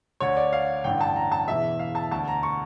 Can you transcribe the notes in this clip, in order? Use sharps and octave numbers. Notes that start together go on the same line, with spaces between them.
D2 D3 C#5
D5
F5
A1 G2 D3 G5
A5
A#5
A5
E1 E2 E3 E5
F5
A5
D2 D3 A5
A#5
C#6